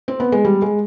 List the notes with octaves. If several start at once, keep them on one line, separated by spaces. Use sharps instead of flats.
C4
B3
G#3
G3
G#3